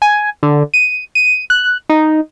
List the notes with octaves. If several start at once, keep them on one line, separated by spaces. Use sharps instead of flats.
G#5
D3
D#7
D#7
F#6
D#4